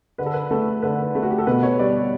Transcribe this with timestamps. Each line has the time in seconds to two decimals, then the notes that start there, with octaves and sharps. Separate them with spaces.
0.18 D3 B4
0.26 A4
0.33 B4
0.51 A3 A4
0.82 D3 B4
1.15 A3
1.23 F#4
1.31 G4
1.38 A4
1.47 B2 B4
1.63 C#5
1.79 G3 D5